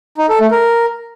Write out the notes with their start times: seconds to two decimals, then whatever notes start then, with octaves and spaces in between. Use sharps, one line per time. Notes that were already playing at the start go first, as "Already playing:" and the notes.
0.18 D#4
0.29 A4
0.40 A3
0.51 A#4